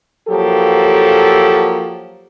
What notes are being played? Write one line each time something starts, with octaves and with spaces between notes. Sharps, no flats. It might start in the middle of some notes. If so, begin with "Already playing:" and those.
F3 F#3 A#3 G4 A4